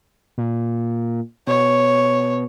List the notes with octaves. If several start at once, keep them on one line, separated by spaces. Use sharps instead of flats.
A#2
B2 C#5